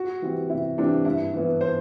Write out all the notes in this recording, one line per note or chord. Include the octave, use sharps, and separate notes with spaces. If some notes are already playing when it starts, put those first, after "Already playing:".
Already playing: F#4
E3 G3 C4
C3 E4
E3 G3 C4 D4
G2 E4
E3 B3
C5